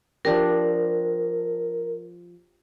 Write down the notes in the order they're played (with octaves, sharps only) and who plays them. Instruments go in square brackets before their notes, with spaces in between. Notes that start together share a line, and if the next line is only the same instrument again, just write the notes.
[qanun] F3 D4 G4 [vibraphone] A#4